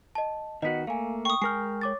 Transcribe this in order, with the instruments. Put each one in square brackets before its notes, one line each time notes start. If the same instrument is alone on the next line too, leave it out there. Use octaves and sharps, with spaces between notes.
[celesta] D#5 A5
[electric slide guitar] D#3 B3 F#4 [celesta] D#5 B6
[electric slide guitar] A3 A#3 [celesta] F5 G#5
[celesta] G5 [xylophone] C#6 D#6
[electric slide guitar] G#3 A#4 G5 [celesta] G#5 F6 [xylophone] C7
[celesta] C#5 D6 A6